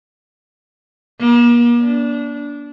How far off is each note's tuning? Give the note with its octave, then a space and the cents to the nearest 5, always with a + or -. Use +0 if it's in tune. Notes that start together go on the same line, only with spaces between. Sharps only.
A#3 +40
D4 -20